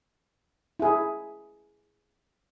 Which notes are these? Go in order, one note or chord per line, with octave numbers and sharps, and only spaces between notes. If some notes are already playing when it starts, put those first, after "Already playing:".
E4 G#4